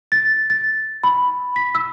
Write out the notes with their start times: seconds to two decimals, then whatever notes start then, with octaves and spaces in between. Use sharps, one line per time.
0.12 A6
0.50 A6
1.04 B5
1.56 B6
1.75 E6